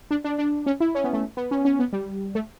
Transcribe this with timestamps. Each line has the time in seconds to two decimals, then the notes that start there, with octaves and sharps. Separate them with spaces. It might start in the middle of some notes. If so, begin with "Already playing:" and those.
0.11 D4
0.24 D4
0.38 D4
0.66 C#4
0.80 E4
0.95 C#4
1.04 B3
1.13 A3
1.37 B3
1.51 C#4
1.65 C#4
1.79 B3
1.93 G3
2.35 A3